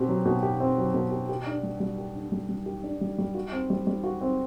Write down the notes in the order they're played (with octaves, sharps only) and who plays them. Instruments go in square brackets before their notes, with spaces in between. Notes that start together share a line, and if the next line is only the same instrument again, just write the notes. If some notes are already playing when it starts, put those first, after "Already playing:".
Already playing: [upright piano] B2 C4 G4
F#3
B2
G4
C4
F#3
B2
G4
G4
D4
G3
G3
G4
D4
G3
G3
G4
D4
G3
G3
F#4
C4
G3
G3
F#4
C4